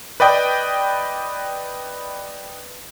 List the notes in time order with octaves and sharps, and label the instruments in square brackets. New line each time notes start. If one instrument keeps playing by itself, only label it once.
[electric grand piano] B4 D5 D#5 G5